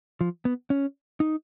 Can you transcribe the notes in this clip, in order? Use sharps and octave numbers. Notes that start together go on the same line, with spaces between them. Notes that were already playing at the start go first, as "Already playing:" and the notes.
F3
B3
C#4
D#4